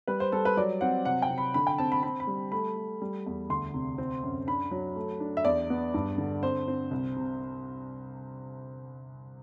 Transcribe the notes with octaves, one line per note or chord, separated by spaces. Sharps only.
G3 B4
C5
G3 A4
B4
F#3 D5
C4 F#5
C3 F#5
G5
C3
B5
D3 B5
G5
C4 A5
B5
C4 B5
B5
G3
A3 B5
A3
G3
E2
D2 C6
C3
C4
F#2
D4 B5
F#3
A3
D4
E5
E2 D5
B3
G2
D3
C4 C5
C4
C2
C3